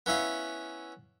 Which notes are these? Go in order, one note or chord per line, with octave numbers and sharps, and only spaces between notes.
B3 C#4 E4 F5